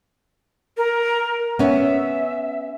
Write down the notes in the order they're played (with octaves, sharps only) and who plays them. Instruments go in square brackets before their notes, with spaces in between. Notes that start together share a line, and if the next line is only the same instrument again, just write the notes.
[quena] A#4
[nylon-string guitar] B3 C#4 [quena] E5